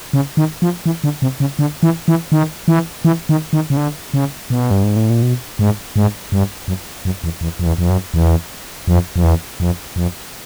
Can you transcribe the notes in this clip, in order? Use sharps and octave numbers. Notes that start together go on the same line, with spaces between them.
C#3
D#3
F3
E3
D3
C3
C#3
D3
E3
E3
D#3
E3
E3
D#3
D#3
C#3
D3
C#3
B2
G2
G#2
A2
A#2
B2
G#2
G#2
G2
F#2
F#2
E2
E2
F2
E2
F2
F#2
E2
F2
F2
E2
F2
F2